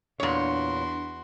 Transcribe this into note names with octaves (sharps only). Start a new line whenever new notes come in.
E2 A#2 D4 F#4 C#5 C6